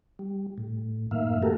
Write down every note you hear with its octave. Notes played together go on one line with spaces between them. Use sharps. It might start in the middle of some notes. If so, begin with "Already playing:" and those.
G3
A2
F#2 A2 D#3 A#3 E5 F5
A3 A#3 F#4 G4 A4 A#4